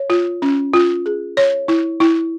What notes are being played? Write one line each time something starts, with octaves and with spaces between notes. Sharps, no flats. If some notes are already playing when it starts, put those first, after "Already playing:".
Already playing: C#5
F4
C#4
F4
G#4
C#5
E4
E4